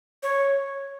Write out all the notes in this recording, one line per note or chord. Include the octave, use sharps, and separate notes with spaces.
C#5